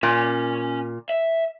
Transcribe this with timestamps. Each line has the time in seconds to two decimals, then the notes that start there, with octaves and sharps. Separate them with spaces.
0.03 A#2 C#4 G#5
1.09 E5